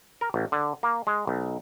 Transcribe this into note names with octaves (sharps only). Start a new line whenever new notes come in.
A#4
A1
D3
A#3
G#3
B1